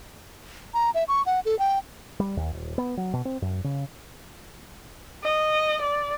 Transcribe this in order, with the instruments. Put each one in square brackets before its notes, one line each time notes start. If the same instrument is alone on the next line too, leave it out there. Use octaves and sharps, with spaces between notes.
[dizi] A#5
E5
C#6
F#5
A4
G5
[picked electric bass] G3
D#2
D#1
B3
F#3
B2
C4
F#2
C#3
[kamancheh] D#5
D5